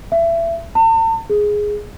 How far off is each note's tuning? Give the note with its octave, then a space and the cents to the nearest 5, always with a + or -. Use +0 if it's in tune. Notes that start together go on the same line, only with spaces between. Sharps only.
E5 +25
A5 +45
G#4 +0